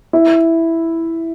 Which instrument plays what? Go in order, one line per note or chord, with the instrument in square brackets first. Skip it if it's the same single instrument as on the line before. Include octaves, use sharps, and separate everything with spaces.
[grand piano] E4